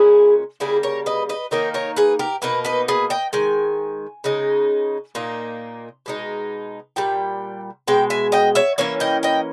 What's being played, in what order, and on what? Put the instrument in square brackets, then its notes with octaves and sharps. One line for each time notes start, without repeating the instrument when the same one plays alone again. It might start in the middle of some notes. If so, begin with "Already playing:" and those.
Already playing: [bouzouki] A#2 G#3 C#4 E4 G#4
C#3 G3 A#3 E4 G#4
A#4 C#5
B4 D#5
B4 D#5
D#3 A#3 D#4 A#4 C#5
A#4 C#5
G#4 B4
G4 A#4
B2 A#3 D#4 B4
B4 D#5
G#4 B4
D#5 G5
D#3 G#3 G#5
C#3 G#3 D#4
A#2 A#3 D#4
B2 G#3 D#4
A#2 G3 G5
B2 G#3 G5
E5 G#5
D#5 G5
C#5 E5
E3 A#3 C#4 C#5 E5
D#5 G5
D#5 G5